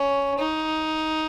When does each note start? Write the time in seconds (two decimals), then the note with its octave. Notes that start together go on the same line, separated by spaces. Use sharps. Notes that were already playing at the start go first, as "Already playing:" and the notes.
Already playing: C#4
0.40 D#4